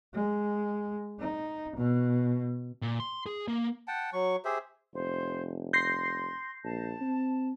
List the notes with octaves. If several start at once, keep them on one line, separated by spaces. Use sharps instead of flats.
G#3
D#4
B2
A#2
C6
G#4
A#3
F#5 G5 A5
F#3 C#6
G4 G#4 C5 E5
F1 C5
C6 G6 A#6 C7
A#1 A5
C4